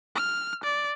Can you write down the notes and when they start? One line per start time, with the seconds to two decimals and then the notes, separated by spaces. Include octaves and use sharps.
0.16 F6
0.63 D5